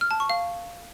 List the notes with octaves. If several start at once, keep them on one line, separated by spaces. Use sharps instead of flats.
F6
A5
C#6
F5